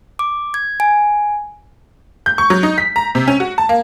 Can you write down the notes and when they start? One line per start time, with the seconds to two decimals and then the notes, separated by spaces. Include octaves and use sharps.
0.19 D6
0.54 G#6
0.80 G#5
2.26 G6
2.38 C#6
2.50 F#3
2.63 D#4
2.78 B6
2.96 A#5
3.15 C3
3.28 C#4
3.40 F#4
3.58 A5
3.69 A#3